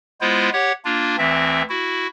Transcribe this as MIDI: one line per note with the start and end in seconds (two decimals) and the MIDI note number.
0.21 0.50 56
0.21 0.50 59
0.21 0.50 64
0.21 0.50 65
0.21 0.50 72
0.53 0.72 67
0.53 0.72 73
0.53 0.72 78
0.85 1.16 58
0.85 1.16 62
0.85 1.16 65
1.18 1.62 38
1.18 1.62 52
1.18 1.62 60
1.18 1.62 76
1.69 2.07 64
1.69 2.07 66